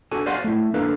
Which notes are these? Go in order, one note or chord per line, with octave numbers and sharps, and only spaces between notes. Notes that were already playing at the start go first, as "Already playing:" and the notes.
D4 F#4 A4 G#5
C5 D5 F5 F#5 G#5 C6
A3 E4
A#3 D4 A4 B4 F5